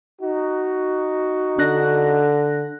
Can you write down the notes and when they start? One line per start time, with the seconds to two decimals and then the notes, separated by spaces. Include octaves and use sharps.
0.22 D#4 F#4
1.59 D3 D4 F#6 A#6